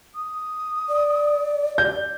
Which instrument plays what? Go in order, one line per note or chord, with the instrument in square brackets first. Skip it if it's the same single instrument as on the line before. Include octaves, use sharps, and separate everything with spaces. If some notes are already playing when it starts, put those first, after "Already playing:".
[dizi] D#6
[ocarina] D5
[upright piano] G6